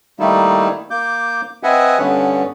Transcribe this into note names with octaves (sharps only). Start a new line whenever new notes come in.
D#3 G3 A3 A#3 D#4 E4
A#3 D6 G6
C4 B4 D#5 E5 F#5 G#5
G2 D3 B3 C#4